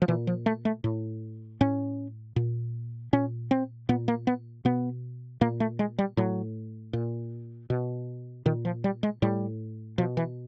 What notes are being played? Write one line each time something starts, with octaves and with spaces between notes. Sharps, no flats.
F3
A#2 E3
F3
A3
A3
A2
A2 C#4
A#2
A#2 C#4
C4
A#2 B3
A#3
B3
B2 B3
A#2 A#3
A3
G#3
G3
A2 F#3
A#2
B2
A#2 D#3
F3
G3
G#3
A2 G3
B2 F3
E3